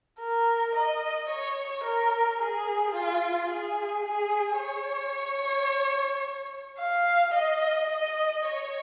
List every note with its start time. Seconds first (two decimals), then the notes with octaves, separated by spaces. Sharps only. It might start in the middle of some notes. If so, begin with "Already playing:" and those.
0.19 A#4
0.74 D#5
1.30 C#5
1.84 A#4
2.40 G#4
2.94 F4
3.49 G#4
4.05 G#4
4.59 C#5
6.79 F5
7.34 D#5
7.89 D#5
8.44 C#5